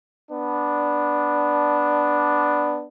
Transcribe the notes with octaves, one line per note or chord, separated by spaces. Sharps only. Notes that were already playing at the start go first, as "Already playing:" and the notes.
B3 D4